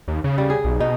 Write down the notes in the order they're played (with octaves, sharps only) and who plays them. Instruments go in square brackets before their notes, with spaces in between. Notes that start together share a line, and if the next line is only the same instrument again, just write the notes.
[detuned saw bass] D#2
C#3
[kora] G3
G#4
[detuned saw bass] B1
[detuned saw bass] B2 [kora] D#4